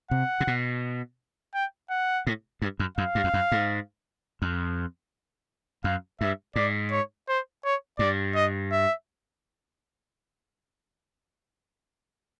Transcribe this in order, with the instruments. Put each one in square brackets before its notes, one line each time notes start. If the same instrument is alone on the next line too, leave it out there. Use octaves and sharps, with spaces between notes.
[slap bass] C3 [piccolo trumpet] F#5
[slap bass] C3
B2
[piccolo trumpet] G5
F#5
[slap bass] A2
G2
F#2
[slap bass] F#2 [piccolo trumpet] F5
[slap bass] G2
F2
F#2
G#2
F2
[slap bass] F#2 [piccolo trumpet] F5
[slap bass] G2 [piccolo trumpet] E5
[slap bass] G#2 [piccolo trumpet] D5
[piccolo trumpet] C#5
C5
C#5
[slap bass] G2 [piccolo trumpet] D5
[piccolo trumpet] D#5
E5